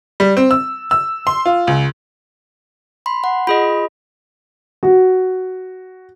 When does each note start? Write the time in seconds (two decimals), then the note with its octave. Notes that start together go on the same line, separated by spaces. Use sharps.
0.20 G3
0.37 C4
0.51 E6
0.91 E6
1.27 C6
1.46 F4
1.67 C#2
3.06 B5 C6
3.24 F#5
3.47 F4 G#4 D#5 B5
4.83 F#4